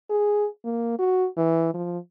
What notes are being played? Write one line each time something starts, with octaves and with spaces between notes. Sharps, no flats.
G#4
A#3
F#4
E3
F3